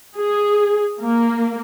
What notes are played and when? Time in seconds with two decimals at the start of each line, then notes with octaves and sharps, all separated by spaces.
0.16 G#4
1.02 A#3